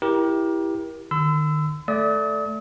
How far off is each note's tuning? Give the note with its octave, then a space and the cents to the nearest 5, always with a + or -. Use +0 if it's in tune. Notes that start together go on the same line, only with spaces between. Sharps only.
E4 +0 G4 +0 A#4 +30
D#3 -35 C6 -45 E6 +0
A3 +0 D5 +0 D#6 +45